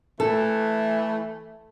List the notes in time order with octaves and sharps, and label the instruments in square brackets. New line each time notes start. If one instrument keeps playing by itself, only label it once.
[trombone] E3 [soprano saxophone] A3 [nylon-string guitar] A4